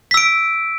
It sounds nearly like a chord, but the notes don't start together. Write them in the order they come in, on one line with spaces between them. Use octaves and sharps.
B6 E6 D7